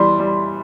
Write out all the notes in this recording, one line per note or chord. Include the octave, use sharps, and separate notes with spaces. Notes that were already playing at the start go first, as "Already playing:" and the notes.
Already playing: E3 G3 C6
G3